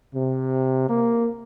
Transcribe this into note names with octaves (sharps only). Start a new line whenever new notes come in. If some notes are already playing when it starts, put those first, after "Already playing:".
C3
A#3